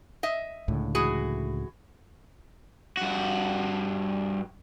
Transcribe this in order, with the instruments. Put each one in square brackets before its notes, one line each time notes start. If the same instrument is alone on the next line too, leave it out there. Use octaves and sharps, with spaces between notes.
[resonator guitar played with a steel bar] D#5 E5
[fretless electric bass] C#2 A2 D3
[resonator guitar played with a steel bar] E3 F#4 G#4
[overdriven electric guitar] G2 F#4